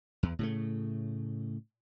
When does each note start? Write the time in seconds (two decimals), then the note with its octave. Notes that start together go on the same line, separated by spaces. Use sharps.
0.23 E2
0.39 A2 C#3 A3